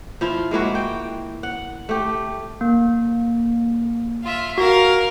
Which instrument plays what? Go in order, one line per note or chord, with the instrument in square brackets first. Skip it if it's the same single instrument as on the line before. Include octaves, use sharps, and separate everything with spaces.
[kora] F3 E4 F4
G#3 A#3 E4 F#4
G5
F#5
A3 G4
[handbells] A#3
[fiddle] F4 E5
[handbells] F#4 [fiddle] A#4 F5